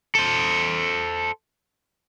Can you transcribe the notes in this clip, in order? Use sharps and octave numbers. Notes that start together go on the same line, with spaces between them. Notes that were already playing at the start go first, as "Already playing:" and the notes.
A4 C5